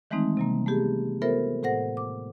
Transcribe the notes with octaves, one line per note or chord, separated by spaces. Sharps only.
D#3 E3 G#3 A3 C4 D#4
C3 G3 A#3
A3 B3 G4 G#4
B3 F4 A4 A#4 C5 E5
A2 A4 C5 F#5 A#6
D6